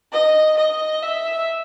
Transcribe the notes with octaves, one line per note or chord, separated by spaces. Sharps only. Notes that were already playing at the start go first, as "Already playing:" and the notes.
D#5
D#5
E5